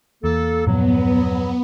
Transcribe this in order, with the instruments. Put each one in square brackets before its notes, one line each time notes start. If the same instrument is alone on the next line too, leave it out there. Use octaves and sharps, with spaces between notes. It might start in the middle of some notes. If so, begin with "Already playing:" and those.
[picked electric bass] E2 [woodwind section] A#3 A4
[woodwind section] E2 F#3 [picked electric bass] G2 A#2 F3 [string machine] B3